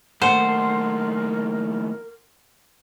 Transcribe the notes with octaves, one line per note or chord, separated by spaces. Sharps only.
D#2 A2 A#4 C5 F#5